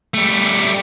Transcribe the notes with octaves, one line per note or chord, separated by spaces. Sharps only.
G3 A3